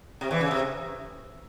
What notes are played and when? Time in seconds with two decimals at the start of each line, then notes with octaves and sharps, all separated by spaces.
0.21 C3
0.31 E2 E3
0.41 C#3
0.51 C3